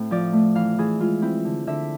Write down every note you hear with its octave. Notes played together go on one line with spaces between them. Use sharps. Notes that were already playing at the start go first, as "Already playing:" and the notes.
Already playing: A2 C4
F3 D5
A3
E3 F5
E3 G#4
G#3 F4
C4 E4
D3
D3 E5